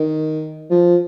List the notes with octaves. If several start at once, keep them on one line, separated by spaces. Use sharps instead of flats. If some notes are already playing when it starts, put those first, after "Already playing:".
Already playing: D#3
F3